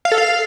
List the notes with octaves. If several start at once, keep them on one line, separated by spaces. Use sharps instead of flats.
F5
A4
F5